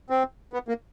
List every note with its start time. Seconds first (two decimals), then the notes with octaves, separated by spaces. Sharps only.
0.10 C4
0.53 B3
0.68 A#3